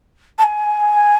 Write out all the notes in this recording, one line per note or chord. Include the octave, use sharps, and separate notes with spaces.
A5
G#5